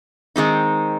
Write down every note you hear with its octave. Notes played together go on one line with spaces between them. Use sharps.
D#3 G#3 C4 D#4